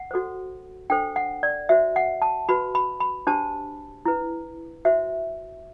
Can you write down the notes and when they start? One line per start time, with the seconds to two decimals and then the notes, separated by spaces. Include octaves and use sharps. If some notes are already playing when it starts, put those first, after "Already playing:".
Already playing: F#5
0.11 F#4 A4 C5
0.90 D4 A4 C5 G5
1.16 F#5
1.43 D5
1.69 F#4 C5 E5
1.96 F#5
2.22 A5
2.49 F#4 B4 B5
2.75 B5
3.00 B5
3.27 D4 G4 C5 A5
4.05 E4 B4
4.85 F#4 C5 E5